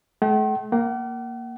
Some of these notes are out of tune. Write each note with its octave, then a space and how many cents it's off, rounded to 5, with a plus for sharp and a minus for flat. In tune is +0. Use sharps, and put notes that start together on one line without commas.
A3 -45 G5 -45
A#3 +0 F#5 +45